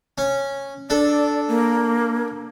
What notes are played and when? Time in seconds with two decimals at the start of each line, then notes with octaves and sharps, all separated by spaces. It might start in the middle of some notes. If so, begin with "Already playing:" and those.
0.18 C#4
0.90 D4 A4 D5
1.48 A#3